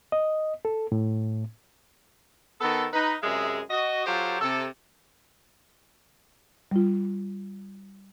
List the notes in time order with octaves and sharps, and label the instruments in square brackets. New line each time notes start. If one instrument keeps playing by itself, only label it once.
[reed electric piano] D#5
A4
A2
[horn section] D#3 B3 A4
D#4 B4
F#2 C3 G#3 G#4 E5
F#4 D#5
F#3 F4 G4 A4 C5
C3 A4
[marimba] G3 F4